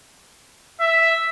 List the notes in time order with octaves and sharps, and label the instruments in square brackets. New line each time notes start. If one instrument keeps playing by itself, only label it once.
[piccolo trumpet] E5